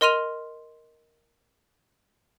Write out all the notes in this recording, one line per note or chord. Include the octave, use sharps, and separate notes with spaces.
A#4 D#5 C6 F6 D#7 F7